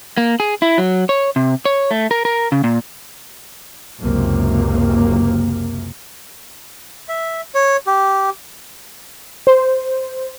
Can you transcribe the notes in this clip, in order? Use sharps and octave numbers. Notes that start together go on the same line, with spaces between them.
A#3
G#4
E4
F#3
C#5
C3
C#5
A3
A#4
A#4
C#3
A#2
F#1 C#2 F#2 C3 A#3
E5
C#5
G4
C5